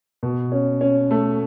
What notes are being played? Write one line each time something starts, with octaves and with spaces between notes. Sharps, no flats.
B2
C#4
C#4
A3